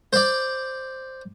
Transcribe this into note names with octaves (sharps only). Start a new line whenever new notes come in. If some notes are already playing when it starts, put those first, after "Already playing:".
C5 D5